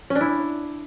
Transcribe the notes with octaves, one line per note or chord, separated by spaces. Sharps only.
C#4
D4
E4